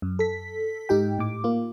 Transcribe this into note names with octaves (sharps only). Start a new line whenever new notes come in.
F#2
A4 B6
G#2 D#4 G4 G5
A2 D6
A#3 F4